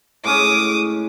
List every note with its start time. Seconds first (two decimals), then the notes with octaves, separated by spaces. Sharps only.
0.25 A2 G#3 C#4 D6 D#6